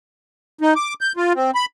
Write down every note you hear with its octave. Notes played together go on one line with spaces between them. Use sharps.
D#4
D6
G6
F4
C4
B5